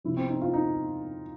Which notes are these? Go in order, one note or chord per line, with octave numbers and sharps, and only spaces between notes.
C3 F3 E4
C4
D#4
F4
D#4